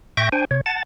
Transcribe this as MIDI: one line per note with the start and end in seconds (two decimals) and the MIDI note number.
0.17 0.29 45
0.17 0.29 76
0.17 0.29 79
0.17 0.29 85
0.17 0.29 91
0.17 0.29 94
0.32 0.45 62
0.32 0.45 72
0.32 0.45 79
0.32 0.45 80
0.51 0.61 48
0.51 0.61 73
0.66 0.83 78
0.66 0.83 81
0.66 0.83 93